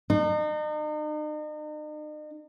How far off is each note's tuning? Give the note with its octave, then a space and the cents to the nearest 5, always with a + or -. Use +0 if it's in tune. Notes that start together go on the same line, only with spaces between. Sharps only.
D#4 -40